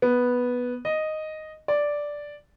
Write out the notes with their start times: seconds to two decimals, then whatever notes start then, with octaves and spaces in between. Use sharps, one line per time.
0.02 B3
0.85 D#5
1.68 D5